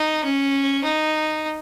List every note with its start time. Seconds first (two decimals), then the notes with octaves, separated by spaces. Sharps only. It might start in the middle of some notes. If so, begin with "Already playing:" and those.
Already playing: D#4
0.24 C#4
0.84 D#4